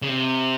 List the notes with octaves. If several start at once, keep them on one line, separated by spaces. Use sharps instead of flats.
C#3
C3